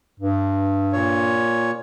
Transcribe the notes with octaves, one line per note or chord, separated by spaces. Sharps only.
G2
A#2 C#5